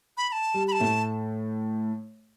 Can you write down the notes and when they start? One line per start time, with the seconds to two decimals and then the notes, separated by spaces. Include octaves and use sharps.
0.17 B5
0.29 B5
0.32 A5
0.54 G3
0.68 B5
0.72 A5
0.80 A2 A3